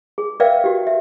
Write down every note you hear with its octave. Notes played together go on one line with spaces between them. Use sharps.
G#4
A#4 B4 D5 E5 F5 G5
F#4 G4
E5